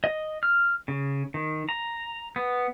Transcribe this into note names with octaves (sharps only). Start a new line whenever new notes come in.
D#5
F6
C#3
D#3
A#5
B3